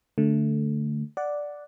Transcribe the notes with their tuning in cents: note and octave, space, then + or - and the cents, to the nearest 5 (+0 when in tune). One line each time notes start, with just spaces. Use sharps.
D3 -10 A3 +0
D5 +0 F#5 +0